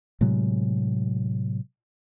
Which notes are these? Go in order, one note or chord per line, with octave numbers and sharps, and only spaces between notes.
A2 C3 F#3 G#3